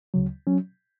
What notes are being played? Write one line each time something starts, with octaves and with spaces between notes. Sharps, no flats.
D2 C#3 F#3
F#3 C#4